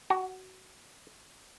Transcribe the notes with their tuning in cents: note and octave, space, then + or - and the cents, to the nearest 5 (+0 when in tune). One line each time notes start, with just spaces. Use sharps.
F#4 +20